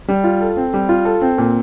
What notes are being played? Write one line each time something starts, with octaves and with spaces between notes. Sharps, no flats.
G3
F4
A4
C4
G3
F4
A4
C4
A#2